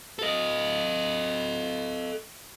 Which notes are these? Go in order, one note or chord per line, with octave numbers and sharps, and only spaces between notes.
A4 D#5